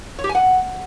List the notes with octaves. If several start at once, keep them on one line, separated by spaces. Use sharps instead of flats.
C#5
G4
G#5
F#5